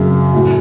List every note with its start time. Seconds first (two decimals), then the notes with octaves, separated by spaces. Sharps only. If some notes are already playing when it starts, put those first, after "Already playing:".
Already playing: F#2 C#3 F#3
0.33 A2 F#3